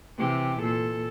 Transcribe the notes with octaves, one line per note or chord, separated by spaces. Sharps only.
C3 E3 G4
A#2 A4